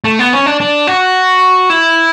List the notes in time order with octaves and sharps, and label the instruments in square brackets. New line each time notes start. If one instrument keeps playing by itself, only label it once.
[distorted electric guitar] A3
B3
C#4
D4
D4
F#4
E4